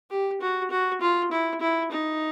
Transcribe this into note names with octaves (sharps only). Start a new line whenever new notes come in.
G4
F#4
F#4
F4
E4
E4
D#4